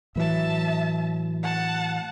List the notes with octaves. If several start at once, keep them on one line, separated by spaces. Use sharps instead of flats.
A2 E3 F#3 E5 A5
F#5 A5